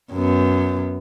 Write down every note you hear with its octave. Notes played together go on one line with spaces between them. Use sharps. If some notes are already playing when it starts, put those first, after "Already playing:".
F#2 B3